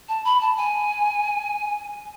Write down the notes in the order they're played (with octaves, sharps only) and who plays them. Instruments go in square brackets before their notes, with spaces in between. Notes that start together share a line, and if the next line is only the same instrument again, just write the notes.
[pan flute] A5
B5
A5
G#5